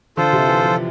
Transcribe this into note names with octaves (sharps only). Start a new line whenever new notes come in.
D3 F4 A4 C5
C3
E3
F3